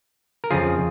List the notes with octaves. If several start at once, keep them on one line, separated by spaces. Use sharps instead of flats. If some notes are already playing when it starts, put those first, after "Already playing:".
A#4
F2 C#3 F3 F4 G#4